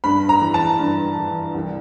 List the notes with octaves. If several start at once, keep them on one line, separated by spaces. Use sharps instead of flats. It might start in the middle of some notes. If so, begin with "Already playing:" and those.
G2 B5
A#5
E3
A5
G2
E3
C2